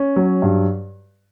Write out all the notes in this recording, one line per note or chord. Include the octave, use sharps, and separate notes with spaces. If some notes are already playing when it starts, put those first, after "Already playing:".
Already playing: C#4
F#3
G2